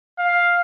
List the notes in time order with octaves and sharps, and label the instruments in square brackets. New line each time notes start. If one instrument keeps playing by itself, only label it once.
[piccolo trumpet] F5